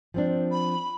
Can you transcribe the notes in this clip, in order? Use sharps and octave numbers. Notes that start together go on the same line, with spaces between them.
F3 C4 D4
B5